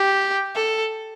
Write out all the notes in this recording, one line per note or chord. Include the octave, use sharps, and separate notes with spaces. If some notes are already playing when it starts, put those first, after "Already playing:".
Already playing: G4
A4